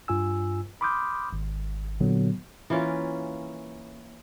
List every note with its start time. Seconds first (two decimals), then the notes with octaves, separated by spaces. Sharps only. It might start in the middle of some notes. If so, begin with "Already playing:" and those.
0.08 G2 F4 G#5 E6
0.81 B5 C6 D6 D#6 F6 G6
1.33 G#1
2.00 A#2 D3 F#3 B3
2.70 E3 A#3 C#4 F4